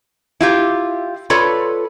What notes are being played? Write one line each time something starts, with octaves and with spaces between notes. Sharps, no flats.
E4 F4 G4
F4 A4 B4 C#5 D5